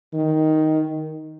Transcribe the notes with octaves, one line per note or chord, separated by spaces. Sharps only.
D#3